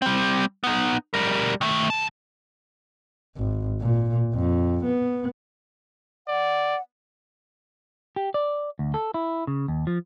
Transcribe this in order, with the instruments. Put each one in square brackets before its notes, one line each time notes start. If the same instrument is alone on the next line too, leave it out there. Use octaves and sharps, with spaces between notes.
[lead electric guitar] G3 C4
B3 D#4
G3 A#4
D#3 A3
C#2 A5
[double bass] G#1
A#2
F2
B3
[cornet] D5 [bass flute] F#5
[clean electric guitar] G4
D5
D2
A4
E4
C#3
D#2
F3